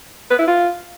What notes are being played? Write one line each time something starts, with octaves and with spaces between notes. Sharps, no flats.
B4
E4
F4